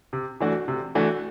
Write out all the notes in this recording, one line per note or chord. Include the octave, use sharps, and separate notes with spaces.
C3
E3 A3 D4 F#4
C3
E3 A3 D4 F#4